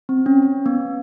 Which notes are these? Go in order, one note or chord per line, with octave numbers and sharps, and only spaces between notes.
C4
C#4
C#4
B3